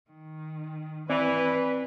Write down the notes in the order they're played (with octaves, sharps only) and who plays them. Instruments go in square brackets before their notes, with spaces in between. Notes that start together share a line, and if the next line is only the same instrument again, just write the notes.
[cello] D#3
[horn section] E3 [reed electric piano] C4 D5 [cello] B4